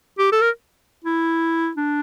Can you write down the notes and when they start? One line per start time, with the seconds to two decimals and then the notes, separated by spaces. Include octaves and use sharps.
0.18 G4
0.32 A4
0.41 A#4
1.05 E4
1.77 D4